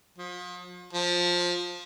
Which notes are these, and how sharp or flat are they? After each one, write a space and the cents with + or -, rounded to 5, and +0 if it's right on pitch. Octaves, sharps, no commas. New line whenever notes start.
F3 +40
F3 +15